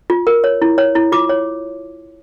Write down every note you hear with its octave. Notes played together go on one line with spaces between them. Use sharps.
F4
A#4
C#5
E4
C#5
E4
F4 D6
C#5